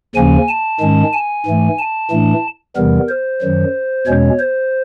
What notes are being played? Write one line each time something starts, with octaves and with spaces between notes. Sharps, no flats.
D#2 C#3 F3 A#3 C#4 G#5
A5
G#2 D#3 G#3 C#4
G#5
G#2 E3 A3
A5
A2 E3 A3 D4
E2 C3 E3 G3 B3 A#4
C5
F#2 D#3 F#3
E2 B2 G#3 C#4 C#5
C5